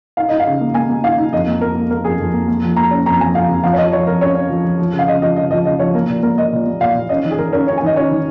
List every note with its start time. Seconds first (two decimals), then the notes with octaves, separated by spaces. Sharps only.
0.17 D#4 F5
0.29 D#4 D#5
0.40 F5
0.46 C#3
0.61 A#3
0.74 A#3 G#5
0.89 A#3
1.04 D#4 F5
1.18 D#4
1.32 F2 D#5
1.47 A#3
1.61 A#3 A#4
1.75 A#3
1.90 A#3 A#4
2.04 F2 G#4
2.19 F2
2.34 A#3
2.48 A#3
2.62 F3
2.76 A#3 A#5
2.91 C#4
3.06 F2 A#5
3.20 F3 G#5
3.35 F2 F5
3.49 F2
3.63 F3 F5
3.73 C#5
3.78 F3 D#5
3.92 F3 C#5
4.07 F2 A#4
4.21 C#4 C#5
4.35 C#4
4.49 F3
4.64 F3
4.79 F3
4.93 C#3
4.99 F5
5.08 C#3 D#5
5.22 F3 D#5
5.36 C#3 D#5
5.51 F3 D#5
5.65 C#3 D#5
5.79 F3 C#5
5.94 A#3 A#4
6.09 A#2
6.23 A#3 A#4
6.37 A#3 D#5
6.52 A#2
6.66 A#3
6.81 A#2 F5
6.95 A#2
7.09 C#4 D#5
7.25 D#3
7.31 G#4
7.39 D#3 A#4
7.53 C#4 A#4
7.67 C#4 C#5
7.77 G#5
7.82 D#3 D#5
7.96 C#4 C#5
8.11 D#3